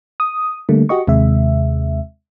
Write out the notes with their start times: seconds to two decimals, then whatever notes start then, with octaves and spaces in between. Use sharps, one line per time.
0.20 D#6
0.69 D3 G3 A3 A#3
0.89 F#4 G4 D#5 C#6
1.07 D#2 C3 G#3 E5